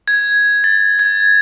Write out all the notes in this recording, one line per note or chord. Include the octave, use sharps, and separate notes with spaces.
G#6
A6
G#6